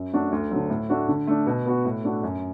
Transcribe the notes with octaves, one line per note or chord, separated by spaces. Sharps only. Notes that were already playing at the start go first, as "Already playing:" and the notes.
Already playing: F#2
F#3 A3 D4 F#4
D2
D3 F#3
A2
A3 D4 F#4
D3
A3 D4
B2
B3 F#4
A2
A3 D4 F#4
F#2